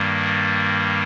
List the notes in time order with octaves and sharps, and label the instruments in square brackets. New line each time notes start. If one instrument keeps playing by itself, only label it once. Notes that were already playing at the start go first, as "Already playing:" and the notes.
Already playing: [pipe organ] G2 D#3 G3 A#3